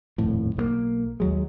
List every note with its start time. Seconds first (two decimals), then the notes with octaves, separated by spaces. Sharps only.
0.18 D#1 F2 A2
0.57 B1 F#3 A#3
1.20 D#2 F#3 G#3